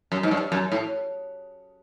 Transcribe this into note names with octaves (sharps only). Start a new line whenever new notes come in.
F#2
G#2
G2
F#2
A2